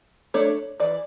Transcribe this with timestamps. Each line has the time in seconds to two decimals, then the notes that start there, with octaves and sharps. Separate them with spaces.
0.34 A3 D4 C#5
0.80 E3 D5